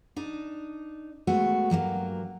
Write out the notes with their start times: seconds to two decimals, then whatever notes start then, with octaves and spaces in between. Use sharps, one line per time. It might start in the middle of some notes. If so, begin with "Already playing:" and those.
0.16 D4 D#4
1.27 G#3 A3 B3 F#4
1.70 G2 F#3 A3 A#3